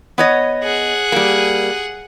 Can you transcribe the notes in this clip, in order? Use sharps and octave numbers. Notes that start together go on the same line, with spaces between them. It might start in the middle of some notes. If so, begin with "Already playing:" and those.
B3 C#5 D#5
G#4 F#5
G3 A#3